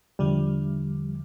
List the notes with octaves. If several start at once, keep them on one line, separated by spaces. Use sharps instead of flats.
E2 D3 F3 G3